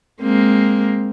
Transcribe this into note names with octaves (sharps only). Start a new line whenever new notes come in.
G#3 A#3 C4